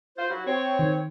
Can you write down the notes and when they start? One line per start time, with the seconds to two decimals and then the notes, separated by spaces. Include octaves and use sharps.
0.17 F4 C5
0.30 F#3 E4 F#4
0.46 C4 C#5
0.79 D#3